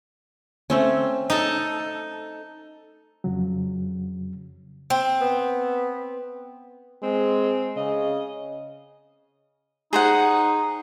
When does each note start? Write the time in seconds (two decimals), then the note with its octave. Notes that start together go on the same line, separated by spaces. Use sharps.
0.70 A3 C4 C#4
1.30 D#4 A4
3.24 F2 C#3 F#3
4.90 C4
5.21 B3
7.03 G#3 C4
7.76 C#3 D#5
9.93 D#4 G#4 C5 F#5